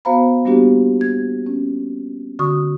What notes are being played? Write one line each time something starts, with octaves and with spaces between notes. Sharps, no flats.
B3 F#4 C5 F5 A#5 B5
G3 A#3 B3 D4 F#4 G4
G#6
C#4
D3 F#4 C#6 D#6